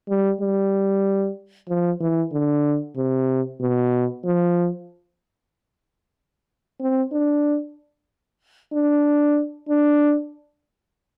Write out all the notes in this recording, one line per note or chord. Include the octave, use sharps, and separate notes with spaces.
G3
G3
F3
E3
D3
C3
B2
F3
C4
D4
D4
D4